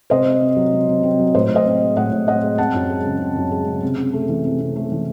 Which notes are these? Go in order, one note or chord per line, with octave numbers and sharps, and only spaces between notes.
C3 C5 D#5
C3
C4
F#3
C3
C3
C4
F#3
A2 C5 D#5
A2
C5 D#5
C4
G#3
A2 D#5 F#5
A2
C4 D#5 F#5
G#3
C4 F#5 A5
F#2
G#3
C#3
C4
F#2
G#3
C#3
C3
C3
A3
E3
C3
C3
A3
E3